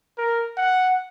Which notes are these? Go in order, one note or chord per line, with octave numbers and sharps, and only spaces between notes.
A#4
F#5